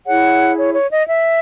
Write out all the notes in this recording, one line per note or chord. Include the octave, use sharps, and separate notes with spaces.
E4 G#4 C#5 F#5
C#5
C#5
D#5
E5